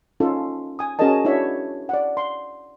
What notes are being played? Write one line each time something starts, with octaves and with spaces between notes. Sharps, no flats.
C#4 D#4 F4 A4
G#5 D#6
C#4 F#4 G#4 A#4 D#5 A5
D4 E4 F#4 C#5 E5
D5 F#5
C6